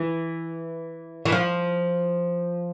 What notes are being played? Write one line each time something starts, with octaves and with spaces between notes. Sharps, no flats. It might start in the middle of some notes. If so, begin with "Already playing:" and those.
Already playing: E3
E3
F3